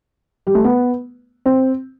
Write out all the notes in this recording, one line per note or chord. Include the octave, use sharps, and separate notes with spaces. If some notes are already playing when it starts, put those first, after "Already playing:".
G3
A3
B3
C4